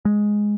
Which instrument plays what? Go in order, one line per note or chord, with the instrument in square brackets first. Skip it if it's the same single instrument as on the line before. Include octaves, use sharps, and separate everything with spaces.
[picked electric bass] G#3